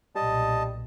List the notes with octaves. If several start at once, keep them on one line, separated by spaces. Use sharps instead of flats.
B1 A#2 G3 D#5 A5